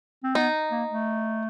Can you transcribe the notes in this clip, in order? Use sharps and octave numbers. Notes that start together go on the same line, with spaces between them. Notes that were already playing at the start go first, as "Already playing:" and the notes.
C4
B3 D#4
A#3
A3